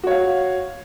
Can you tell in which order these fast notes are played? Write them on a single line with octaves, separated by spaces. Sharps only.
F#4 C#5 F5